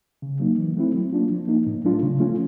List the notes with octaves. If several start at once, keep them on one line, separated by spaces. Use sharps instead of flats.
C#3
F#3 A#3 D#4
E3
A3 C4 E4
F#3
A#3 D4 F4
F3
A#3 D#4
A2
F#3 A3 D4 F4
C#3
F3 A3 C#4 F4